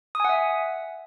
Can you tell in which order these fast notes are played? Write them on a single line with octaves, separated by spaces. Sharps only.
D#6 G#5 F#5 E5